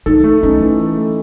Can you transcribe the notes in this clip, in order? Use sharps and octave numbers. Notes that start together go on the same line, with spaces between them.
D#4 A4
A3
C#4 D#4
E3
A4
A3